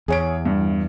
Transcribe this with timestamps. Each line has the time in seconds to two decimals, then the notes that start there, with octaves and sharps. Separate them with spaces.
0.08 E2 G#4 C#5 D7
0.45 G2